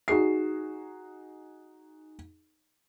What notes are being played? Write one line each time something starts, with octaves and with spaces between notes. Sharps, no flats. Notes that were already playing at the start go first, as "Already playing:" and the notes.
D#4 F#4 G#4 C7